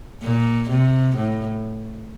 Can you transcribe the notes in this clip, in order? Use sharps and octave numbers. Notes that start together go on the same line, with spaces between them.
A#2
C3
A2